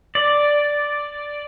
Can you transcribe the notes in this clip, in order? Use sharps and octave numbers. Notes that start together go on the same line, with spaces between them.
D5